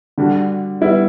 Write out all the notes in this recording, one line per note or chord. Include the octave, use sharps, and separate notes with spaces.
D3 G3 D4 F#4
G3 B3 E4